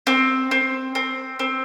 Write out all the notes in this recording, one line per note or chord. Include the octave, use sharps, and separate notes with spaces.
C4
C4
C4
C4